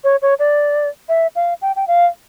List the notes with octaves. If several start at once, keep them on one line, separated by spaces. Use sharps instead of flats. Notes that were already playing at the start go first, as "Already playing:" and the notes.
C#5
C#5
D5
E5
F5
G5
G5
F5